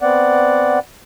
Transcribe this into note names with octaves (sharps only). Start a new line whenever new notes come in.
B3 C4 D5 F#5